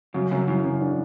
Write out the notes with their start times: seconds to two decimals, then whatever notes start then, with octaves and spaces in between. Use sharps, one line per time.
0.14 F#2 C#3
0.31 F#2 C#3
0.47 F#2 E3
0.63 C#3
0.81 D4